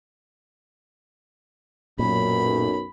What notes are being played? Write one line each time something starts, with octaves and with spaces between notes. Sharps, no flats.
B1 F#2 A#2 B5